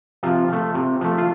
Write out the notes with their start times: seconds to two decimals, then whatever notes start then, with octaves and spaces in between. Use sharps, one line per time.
0.23 C3 F3 F4
0.49 F3 A3
0.75 C3
1.01 F3 A3
1.18 F4